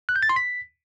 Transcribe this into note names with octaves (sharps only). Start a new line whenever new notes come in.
F#6
G6
A6
C6
B6